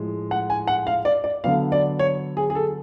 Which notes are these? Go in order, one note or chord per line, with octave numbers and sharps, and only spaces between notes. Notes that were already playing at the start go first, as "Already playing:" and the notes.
Already playing: A2 F3 G#3
F#5
G#5
F#5
F5
D5
D5
D3 F#3 B3 F5
D5
C#5
G#4
G#4
A4